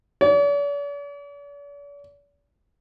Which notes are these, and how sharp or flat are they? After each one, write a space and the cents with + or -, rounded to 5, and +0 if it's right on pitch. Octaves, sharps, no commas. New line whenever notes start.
D5 -45